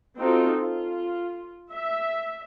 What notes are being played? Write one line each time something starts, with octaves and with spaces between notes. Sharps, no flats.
C4 D#4 F4 F#4 A4
F4
E5